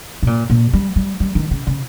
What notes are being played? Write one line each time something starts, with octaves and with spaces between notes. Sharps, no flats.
B2
A#2
A#2
G3
G3
G3
D#3
C#3
C#3